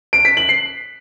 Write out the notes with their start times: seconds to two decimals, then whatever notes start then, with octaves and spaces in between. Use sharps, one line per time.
0.13 D7
0.25 B6
0.37 F#7
0.49 C7